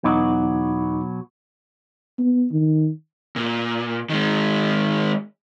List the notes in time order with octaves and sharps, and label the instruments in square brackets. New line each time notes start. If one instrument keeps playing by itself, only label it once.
[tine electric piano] E2 D#4 D6 [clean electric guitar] B2 F#3 F#4
[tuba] B3
D#3
[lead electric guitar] A#2
D#3 G#3